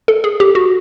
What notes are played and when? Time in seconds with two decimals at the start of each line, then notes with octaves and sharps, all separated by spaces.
0.08 A4
0.24 G#4
0.40 G4
0.55 F#4